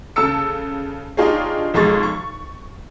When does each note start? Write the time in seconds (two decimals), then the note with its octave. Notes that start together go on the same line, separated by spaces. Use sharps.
0.16 C#3 A4 A5 E6 C#7
1.17 D4 D#4 F4 G4 G#4 C#5
1.74 B1 F2 G#3 C#6 A6
2.03 C#6